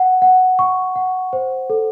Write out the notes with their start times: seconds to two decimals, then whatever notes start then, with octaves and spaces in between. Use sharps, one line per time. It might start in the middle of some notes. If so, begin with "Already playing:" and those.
Already playing: F#5
0.22 F#5
0.59 C#6
0.96 F#5
1.33 C5
1.70 A4